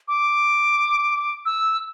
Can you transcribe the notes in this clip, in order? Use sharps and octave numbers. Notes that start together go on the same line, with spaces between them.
D6
E6